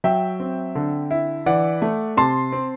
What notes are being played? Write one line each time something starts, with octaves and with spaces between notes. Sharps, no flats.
F#3 E5 G5
C4
D3
E4
E3 D5 F#5
A3
C3 A5 C6
C4